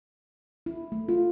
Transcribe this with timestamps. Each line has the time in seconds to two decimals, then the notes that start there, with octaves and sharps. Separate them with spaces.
0.66 E4
0.92 A3
1.09 F4